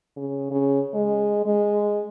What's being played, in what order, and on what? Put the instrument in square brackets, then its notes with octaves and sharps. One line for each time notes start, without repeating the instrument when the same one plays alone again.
[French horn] C#3
C#3
G#3
G#3